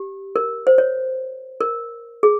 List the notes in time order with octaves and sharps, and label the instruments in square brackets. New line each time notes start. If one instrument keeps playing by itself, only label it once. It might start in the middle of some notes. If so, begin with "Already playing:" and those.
Already playing: [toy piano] G4
A#4
C5
C#5
A#4
G#4